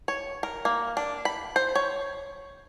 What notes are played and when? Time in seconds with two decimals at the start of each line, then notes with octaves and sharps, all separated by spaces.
0.08 C#5
0.43 A#4
0.65 A#3
0.97 D4
1.25 B5
1.56 C5
1.75 C#5